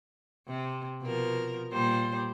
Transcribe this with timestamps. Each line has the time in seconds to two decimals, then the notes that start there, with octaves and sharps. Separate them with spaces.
0.48 C3
1.02 B2 F3 A#4
1.72 A#2 G3 C5